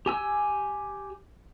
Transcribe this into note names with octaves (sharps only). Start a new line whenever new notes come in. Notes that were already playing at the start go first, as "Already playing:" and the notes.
G4 G#5 E6